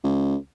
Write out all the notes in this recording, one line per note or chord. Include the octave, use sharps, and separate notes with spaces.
C#2